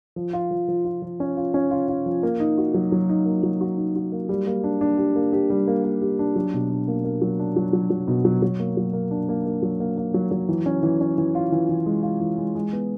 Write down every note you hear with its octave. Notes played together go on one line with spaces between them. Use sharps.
F3
F4
F3
F3
F4
F3
C#4
F4
C#4
F4
F4
F3
A#3
D#4
F#4
F#3
F#3
D#4
A#3
F#3
F#4
D#4
F#4
A#3
G3
A#3
D4
D4
G4
A#3
G4
G3
A#3
A#3
G4
D4
F#3
B2
D4
A#3
A#3
F#3
D4
F#3
F#3
F#3
B2
F#3
F#3
A#3
F#3
A#3
D4
A#3
A#3
F#3
A#3
A#3
F#3
F#3
E3
C#4
E3
C#4
E3
F4
E3
E3
G#3
F4
E3
G#3
G#3
B3